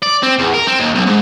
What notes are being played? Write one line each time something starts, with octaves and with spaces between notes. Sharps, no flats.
D5
C4
E2
A#4
C4
D#2
B1
G#2